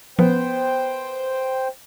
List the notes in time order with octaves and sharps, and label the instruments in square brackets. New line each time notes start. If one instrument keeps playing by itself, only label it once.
[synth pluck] F3 [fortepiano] B3 [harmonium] C5 G5